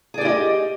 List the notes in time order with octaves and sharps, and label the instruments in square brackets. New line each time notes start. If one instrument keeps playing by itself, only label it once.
[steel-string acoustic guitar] G#4
D5
G4
E4
D#5